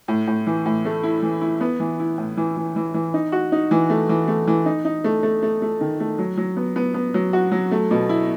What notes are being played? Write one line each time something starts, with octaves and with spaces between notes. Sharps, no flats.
A2
A2
E3
A2
A3
E4
E3
E4
B3
E3
E4
A2
E3
E3
E3
E3
D#4
F#4
D#4
E3
A3
E3
A3
E3
D#4
D#4
A3
A3
A3
A3
D#3
A3
F#3
F#3
B3
B3
B3
F#3
F#4
F#3
A3
B2
E4